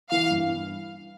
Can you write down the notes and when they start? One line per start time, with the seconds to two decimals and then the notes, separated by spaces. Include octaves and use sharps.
0.11 E3 F5
0.31 G2